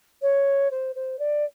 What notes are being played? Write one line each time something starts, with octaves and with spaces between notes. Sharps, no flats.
C#5
C5
C5
D5